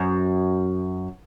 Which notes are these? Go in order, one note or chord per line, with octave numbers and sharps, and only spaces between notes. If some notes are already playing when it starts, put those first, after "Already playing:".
Already playing: F#2